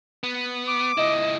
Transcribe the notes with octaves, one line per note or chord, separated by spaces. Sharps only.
B3
D6
C#2 E4 D#5